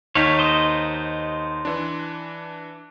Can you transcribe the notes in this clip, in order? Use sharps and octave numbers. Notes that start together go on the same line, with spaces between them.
D#2 D#4 C#5 F5 B6
C5 D#5
E3 D4